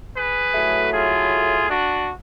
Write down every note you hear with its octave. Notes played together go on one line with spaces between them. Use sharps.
G#4 B4
A2 F#3 A3
F4 G#4
D4 F#4